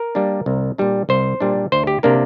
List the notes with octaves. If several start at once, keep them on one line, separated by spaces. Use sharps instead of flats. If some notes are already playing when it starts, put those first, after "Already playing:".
Already playing: A#4
G3 A#3 D4
C2
A#2 G3 D4
C2 C5
A#2 G3 D4
D2 C5
G4
C3 A#3 D4 A#4